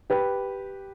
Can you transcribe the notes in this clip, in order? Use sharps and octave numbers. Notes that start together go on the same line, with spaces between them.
G4 B4